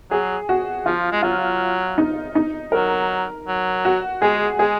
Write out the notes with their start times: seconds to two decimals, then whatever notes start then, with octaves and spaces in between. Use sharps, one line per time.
0.10 F#3 G#4
0.49 F#4
0.86 F3 F4
1.12 G#3
1.22 F#3 F4
1.98 D#4
2.35 D#4
2.72 F#3 A#4
3.48 F#3
3.85 F#4
4.22 G#3 G#4
4.59 G#3 G#4